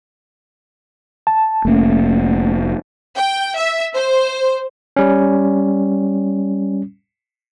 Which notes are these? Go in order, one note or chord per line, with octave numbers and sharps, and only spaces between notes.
A5
F1 A3 A#3 C#4
G5
E5
C5
G3 C#4